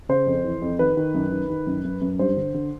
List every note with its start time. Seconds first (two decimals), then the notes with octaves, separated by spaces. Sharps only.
0.09 C#3 C5
0.27 F2
0.44 E3
0.62 F2
0.79 D#3 B4
0.97 D#3
1.14 F#2
1.32 D#3
1.50 D#3
1.67 F#2
1.85 F#2
2.01 F#2
2.19 G2 C5
2.37 D3
2.54 D3